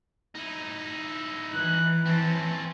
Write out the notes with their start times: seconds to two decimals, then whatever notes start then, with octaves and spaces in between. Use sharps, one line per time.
0.35 D#4 E4
1.53 E3 F#6
2.06 C4 C#4 A5